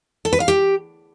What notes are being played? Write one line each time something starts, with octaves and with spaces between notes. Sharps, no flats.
A4
B4
F5
G4